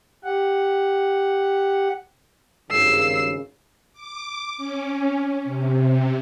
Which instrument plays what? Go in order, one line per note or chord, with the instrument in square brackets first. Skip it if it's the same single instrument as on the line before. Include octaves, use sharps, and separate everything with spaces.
[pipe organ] G4 F#5
[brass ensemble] G#1 G2 C#3 [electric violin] E6 C7
[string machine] D6
C#4
C3